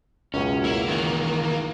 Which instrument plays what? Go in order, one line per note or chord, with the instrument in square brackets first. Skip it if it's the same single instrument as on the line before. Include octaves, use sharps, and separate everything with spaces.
[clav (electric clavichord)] C#2 F#2 B2 [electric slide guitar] C#4
[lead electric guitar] A#3 [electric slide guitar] E4
[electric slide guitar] D#3 E3